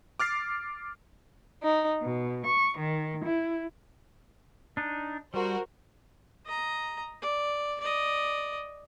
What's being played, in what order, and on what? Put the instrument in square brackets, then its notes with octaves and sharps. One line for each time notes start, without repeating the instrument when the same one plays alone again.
[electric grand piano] D6 F6 A6 C7
[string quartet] D#4
B2
C#6
D#3
E4
[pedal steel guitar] D4 D#4
[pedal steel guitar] G3 [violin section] F#4 A#4 C5
[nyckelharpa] D#5 A#5
D5
D5 D#5